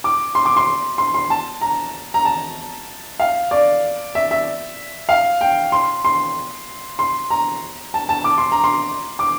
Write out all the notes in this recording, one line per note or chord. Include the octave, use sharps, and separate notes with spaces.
D6
C6
D6
C6
C6
C6
A5
A#5
A#5
A5
F5
D5
E5
E5
F5
G5
C6
C6
C6
A#5
A5
A5
D6
C6
A#5
C6
D6